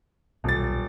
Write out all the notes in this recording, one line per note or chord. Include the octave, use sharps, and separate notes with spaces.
D#1 B1 A6